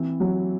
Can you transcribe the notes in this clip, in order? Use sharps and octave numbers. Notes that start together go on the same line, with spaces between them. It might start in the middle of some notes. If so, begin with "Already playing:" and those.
Already playing: E3 C4
F#3